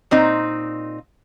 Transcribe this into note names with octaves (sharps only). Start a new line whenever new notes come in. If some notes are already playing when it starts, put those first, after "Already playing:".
A#2 C4 D#4